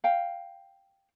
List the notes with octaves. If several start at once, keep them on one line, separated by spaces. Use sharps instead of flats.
F5 G5